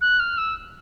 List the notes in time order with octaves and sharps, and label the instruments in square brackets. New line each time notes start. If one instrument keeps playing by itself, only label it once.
[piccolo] F#6
F6
E6